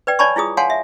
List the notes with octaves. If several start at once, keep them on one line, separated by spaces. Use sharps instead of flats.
B4 D5 G5
C#5 D5 G#5 A5 B5 C#6
E4 F4 G#4 D#6
C#5 F5 F#5 G#5 A5 C6
E5